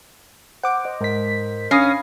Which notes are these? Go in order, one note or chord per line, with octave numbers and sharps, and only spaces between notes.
C5 F#5 D6
C5 D#5
G#2 A#4 C5 D#5 B6
C#4 F5 B5 D#6 A#6 C7